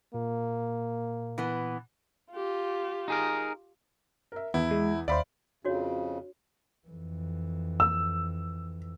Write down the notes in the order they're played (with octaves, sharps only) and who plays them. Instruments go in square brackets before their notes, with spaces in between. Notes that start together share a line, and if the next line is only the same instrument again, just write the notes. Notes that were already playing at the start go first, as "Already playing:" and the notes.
[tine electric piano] A#2 [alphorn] A#3
[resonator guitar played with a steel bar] E3 B3
[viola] F4 G4
[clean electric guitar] D#4 G#4 A#4
[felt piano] A#4 E5
[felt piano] E2 [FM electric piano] B3 [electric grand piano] E4
[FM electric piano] G#3
[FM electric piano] D#2 C5 [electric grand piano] D5 [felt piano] E5 F5 B5
[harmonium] F2 C#3 [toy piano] D4 F#4 C#5
[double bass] F2 E3
[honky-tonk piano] E6